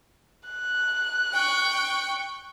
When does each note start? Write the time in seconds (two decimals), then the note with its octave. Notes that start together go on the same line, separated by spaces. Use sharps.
0.49 F#6
1.33 G5 C#6